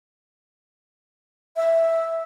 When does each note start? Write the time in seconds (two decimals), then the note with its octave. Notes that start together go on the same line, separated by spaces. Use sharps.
1.56 E5